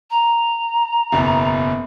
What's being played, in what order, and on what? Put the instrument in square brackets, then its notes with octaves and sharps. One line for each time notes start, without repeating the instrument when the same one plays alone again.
[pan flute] A#5
[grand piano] F#1 E2 B2